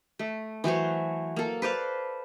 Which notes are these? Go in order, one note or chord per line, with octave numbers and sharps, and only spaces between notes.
A3
E3 F#3 C5 C#5
A#3 A4
B4 C5 D5 F5